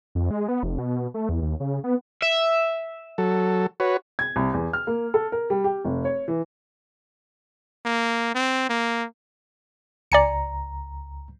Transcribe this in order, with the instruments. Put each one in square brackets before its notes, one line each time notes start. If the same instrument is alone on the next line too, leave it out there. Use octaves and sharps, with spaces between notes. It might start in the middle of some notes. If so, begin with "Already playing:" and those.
[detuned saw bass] F2
G#3
B3
F1
B2
A3
E2
D#2
C#3
B3
[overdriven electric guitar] E5
[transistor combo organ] F#3 A4
F#4 B4 C#5
[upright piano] G#6
C2
E2
F6
A#3
A4
A#4
G3
G4
F1
C#5
E3
[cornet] A#3
C4
A#3
[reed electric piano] C#2 A#5 [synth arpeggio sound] D5 G#5 C#7